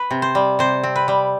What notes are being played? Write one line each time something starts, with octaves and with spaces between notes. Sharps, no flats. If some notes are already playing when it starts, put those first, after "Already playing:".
Already playing: B4
C3
C5
G3
C3 C5
C4
B4
G3